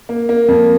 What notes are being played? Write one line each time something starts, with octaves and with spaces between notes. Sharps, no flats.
A#3
A#3
F2